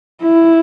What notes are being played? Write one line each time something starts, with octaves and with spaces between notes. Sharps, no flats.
E4